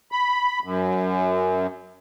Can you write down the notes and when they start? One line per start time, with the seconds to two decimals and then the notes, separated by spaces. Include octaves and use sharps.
0.12 B5
0.64 F#2